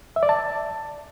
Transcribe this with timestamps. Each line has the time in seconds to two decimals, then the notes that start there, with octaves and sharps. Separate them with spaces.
0.16 E5
0.23 D5
0.29 A5